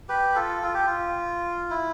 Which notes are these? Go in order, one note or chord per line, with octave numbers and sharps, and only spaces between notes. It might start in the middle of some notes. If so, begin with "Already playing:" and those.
G4 B4
F4 A4
F4
G4
F4
E4